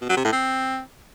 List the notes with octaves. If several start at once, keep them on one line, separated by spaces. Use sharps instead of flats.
B2
F#3
C3
A2
C4